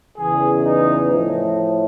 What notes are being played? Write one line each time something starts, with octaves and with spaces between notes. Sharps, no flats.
E2 C#3 E3 G#4
D#4
A2 F3